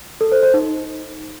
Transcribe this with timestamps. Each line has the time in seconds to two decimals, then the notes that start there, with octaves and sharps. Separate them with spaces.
0.21 A4
0.32 C5
0.43 C5
0.54 D#4